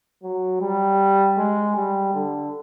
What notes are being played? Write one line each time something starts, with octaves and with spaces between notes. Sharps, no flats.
F#3
G3
G#3
G3
D3